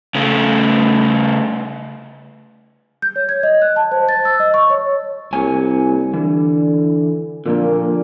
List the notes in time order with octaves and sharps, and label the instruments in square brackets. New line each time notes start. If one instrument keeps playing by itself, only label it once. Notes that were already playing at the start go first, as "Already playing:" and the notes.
[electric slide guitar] C#3 A3
[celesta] G6
C#5
G#6
D#5
F#6
A5
C5
A6
E6
D#5
C#6
C#5
[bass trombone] C2 [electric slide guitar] A#3 C#5 G#5
[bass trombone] D3 [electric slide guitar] E3
[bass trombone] A#2 [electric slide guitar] D3 F3 A#3